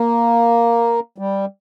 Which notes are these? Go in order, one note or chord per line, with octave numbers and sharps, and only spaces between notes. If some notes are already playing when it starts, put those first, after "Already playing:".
Already playing: A#3
G3